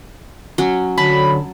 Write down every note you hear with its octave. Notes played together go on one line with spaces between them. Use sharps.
F#3 C#4
D3 F#3 A5 B5